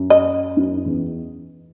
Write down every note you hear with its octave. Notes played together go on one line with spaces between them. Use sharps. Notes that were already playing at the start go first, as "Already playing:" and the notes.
Already playing: F#2
D#5
F#2
E2